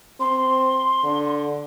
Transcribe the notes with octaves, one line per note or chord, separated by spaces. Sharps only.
C4 C6
D3